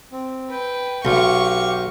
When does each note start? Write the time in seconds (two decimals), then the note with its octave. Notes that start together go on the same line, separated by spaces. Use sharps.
0.12 C4
0.51 B4 G5
1.05 B1 G4 F5 C#6